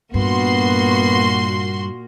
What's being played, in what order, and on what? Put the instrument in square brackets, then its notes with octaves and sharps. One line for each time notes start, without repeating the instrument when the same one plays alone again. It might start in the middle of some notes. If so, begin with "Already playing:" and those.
[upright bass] G2 [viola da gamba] A#2 A#3 [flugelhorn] B3 [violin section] F#4 C6